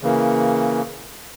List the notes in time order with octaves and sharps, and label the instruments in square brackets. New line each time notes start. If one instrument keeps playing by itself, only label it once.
[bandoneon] C#3 E3 A#3